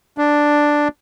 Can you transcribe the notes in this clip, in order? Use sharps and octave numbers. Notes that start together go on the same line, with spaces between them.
D4